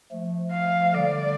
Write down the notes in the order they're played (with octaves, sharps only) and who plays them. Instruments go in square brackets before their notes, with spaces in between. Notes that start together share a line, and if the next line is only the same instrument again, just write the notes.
[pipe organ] F3 A3
[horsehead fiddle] F5
[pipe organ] D3 G3 [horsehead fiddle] D5